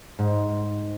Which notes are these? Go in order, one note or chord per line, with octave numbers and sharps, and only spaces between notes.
G#2